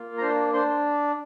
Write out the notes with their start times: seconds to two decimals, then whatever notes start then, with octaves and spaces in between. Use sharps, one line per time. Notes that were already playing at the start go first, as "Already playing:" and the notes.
Already playing: A#3 F4
0.18 A#5
0.21 D4 C5 C6
0.53 D4 C5 C6